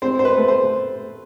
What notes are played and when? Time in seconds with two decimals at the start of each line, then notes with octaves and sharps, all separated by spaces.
0.02 C4 C5
0.19 C5
0.25 B4
0.37 A3
0.48 C5